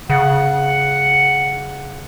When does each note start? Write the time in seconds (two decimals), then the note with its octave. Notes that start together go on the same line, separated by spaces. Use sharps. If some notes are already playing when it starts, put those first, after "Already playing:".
0.10 C#3 F#5